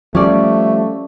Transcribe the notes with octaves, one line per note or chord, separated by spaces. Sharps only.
F3 G3 A3 C#4 D5